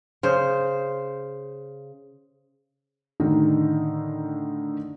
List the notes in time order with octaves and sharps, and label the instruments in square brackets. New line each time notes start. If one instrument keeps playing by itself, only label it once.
[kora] C#3 C5
[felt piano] A2 D3 D#3 D#4